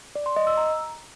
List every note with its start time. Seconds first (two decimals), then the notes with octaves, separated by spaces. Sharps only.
0.16 D5
0.26 C6
0.36 D#5
0.47 E6
0.57 A#5